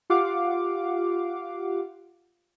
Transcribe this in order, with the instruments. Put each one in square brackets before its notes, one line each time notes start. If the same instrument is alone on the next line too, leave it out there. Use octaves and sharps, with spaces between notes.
[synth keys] F4 G4 F5 F#5 D6